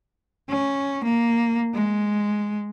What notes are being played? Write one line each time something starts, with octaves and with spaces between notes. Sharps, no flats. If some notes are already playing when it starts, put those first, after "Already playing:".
C#4
A#3
G#3